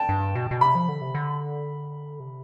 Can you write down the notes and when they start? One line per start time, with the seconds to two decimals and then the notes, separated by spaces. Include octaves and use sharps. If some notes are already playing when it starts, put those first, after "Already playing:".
Already playing: G5 A5
0.09 G2
0.35 B2
0.51 B2
0.61 C3 B5
0.75 F3
0.89 D3
1.01 C3
1.15 D3
2.20 C3